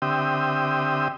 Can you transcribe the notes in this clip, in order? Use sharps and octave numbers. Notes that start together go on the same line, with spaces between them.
D3 C4 G4 E5 G5 D#6